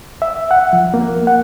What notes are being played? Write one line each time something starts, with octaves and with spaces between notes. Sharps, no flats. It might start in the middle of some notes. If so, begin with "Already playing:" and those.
E5
F#5
F3
A#3
F#5